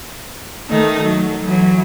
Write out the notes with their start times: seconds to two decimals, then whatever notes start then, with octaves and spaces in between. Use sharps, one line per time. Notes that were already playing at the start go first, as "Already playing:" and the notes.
0.70 D#3 A3 D#4
1.02 F#3
1.43 E3 F#3